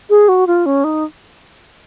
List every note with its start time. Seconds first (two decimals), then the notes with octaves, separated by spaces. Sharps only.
0.10 G#4
0.28 F#4
0.47 F4
0.66 C#4
0.84 D#4